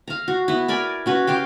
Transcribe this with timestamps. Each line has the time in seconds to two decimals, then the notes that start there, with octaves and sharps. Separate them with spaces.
0.08 F5 A#5
0.28 F#4
0.48 B3 E4
0.68 A#4 D5 G#5 B5
1.06 C#4 F#4 B4
1.27 G4 F5 G5